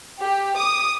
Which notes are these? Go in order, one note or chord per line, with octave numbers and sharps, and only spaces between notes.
G4
D6 D#6